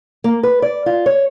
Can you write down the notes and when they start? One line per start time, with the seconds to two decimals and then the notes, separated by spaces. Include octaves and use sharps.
0.24 A#3
0.43 B4
0.62 D5
0.86 F4
1.06 C#5